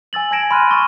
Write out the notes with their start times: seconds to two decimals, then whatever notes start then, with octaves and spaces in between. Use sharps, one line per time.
0.13 G#5 E6 A6 F#7
0.31 G#5 A5 G#6 A#6 D7 E7
0.51 B5 C6 F6 F#6 D#7
0.71 C#6 E6 A6 G7